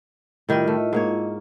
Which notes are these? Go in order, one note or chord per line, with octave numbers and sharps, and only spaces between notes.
A2 D#3 G3 E4 F4 D#5
A3
G#2 A#3 C#5